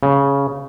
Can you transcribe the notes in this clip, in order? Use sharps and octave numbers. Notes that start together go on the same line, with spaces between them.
C#3